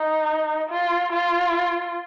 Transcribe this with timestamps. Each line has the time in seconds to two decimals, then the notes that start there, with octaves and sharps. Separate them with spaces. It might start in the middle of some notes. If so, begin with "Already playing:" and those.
Already playing: D#4
0.70 F4
1.13 F4